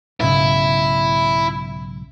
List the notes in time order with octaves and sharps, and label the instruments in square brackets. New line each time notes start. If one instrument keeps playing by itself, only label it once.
[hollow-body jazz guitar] B1 G#2 C#3 [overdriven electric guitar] E4